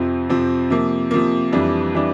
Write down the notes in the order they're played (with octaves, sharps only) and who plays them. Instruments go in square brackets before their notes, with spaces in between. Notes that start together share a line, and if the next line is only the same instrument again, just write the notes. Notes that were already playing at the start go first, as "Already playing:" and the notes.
Already playing: [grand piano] F2 C3 F3 C4
F2 C3 F3 C4
C3 F3 A#3
C3 F3 A#3
F2 E3 G3 D4
E3 G3 D4